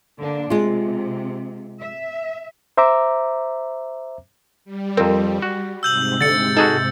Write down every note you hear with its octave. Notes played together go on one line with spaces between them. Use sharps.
D3 A#3 D4
C3 G#3 F4
E5
C5 E5 A#5 D6
G3
F2 C4 A#4
F#4
G#2 C3 E6 G6 F#7
D3 A6 C#7
D#4 F#4 G#4 A4